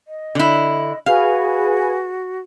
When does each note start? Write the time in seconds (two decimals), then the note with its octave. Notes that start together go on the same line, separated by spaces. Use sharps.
0.08 D#5
0.35 D3 E4
1.06 F#4 G#4 B4 F5 G#5